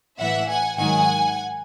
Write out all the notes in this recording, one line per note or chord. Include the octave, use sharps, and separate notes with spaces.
A2 E3 E5 F#5
F#5 G#5
G#2 D#3 F#3 F#5 G#5